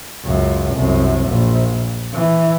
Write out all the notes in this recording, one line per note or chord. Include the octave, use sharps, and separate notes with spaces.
C#2 F#2
C2 F#2
A#1
E3